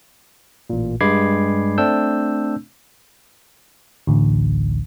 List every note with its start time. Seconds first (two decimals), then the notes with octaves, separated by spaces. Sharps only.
0.70 A1 A#2
1.01 G2 G#3 B5 D6 G#6 C7
1.78 A3 C4 D4 E6 G6
4.07 A1 D2